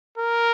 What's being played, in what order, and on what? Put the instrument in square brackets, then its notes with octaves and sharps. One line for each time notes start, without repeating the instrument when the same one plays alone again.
[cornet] A#4